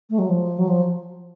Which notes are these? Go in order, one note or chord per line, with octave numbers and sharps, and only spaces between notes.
A3
F#3
F3
F#3
F3